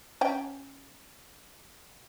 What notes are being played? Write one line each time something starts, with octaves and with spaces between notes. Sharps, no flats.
C#4 G5